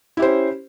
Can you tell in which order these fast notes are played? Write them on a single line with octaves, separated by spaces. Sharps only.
E4 G4 C5 C#4